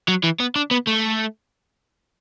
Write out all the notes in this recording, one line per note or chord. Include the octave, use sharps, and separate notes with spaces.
F#3
E3
B3
D4
B3
A3